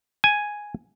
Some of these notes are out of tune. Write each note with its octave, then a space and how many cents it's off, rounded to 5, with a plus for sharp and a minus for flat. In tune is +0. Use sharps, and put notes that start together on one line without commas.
G#5 +0